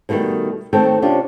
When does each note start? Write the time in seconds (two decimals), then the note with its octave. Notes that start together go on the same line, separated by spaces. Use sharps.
0.09 B2 D3 D#3 G3 A3
0.73 D#3 A3 C4 A4 C#5 G5
1.02 C3 C#4 D4 F4 G4